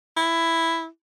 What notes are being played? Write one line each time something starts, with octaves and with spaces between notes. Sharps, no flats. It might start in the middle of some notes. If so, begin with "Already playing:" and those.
E4